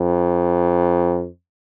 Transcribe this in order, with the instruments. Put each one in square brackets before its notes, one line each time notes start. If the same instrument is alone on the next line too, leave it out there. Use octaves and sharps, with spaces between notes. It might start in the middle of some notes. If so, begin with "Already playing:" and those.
Already playing: [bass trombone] F2